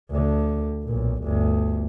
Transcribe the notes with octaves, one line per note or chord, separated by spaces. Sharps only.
D2 D3
B1 A#2
G1 D2